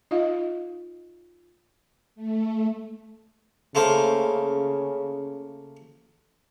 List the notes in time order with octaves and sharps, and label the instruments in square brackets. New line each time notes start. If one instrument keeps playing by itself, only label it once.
[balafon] D#4 F4 D#5 F5
[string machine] A3
[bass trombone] C#3 [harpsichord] A3 A#3 C5